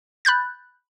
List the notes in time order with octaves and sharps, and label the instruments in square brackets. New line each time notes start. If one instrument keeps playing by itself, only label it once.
[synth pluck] B5 F#6 G6 A6